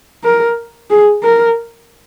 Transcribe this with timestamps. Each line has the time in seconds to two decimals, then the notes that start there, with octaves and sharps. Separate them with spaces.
0.24 A#4
0.90 G#4
1.23 A#4